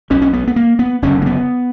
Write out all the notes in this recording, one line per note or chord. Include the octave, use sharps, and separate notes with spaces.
B1 B2 C#4
C#4
B3
B3
A#3
B3
F#1 F#2 D3 C#4
A#3
B3